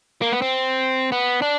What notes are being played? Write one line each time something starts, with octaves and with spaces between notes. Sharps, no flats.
A#3
B3
C4
B3
D4